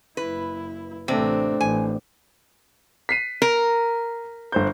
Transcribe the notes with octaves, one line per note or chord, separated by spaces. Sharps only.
F#1 E4 B4
A1 C3 A3 C4 D4
A1 G#5
B6 C7 D#7
A#4
G1 C5 G6